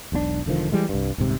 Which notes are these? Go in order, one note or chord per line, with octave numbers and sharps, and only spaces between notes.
E1 B1 A#2 D4
E1 D3 D#3 F3
E3 G3 G#3
C2 G2
D#1 G#2 C3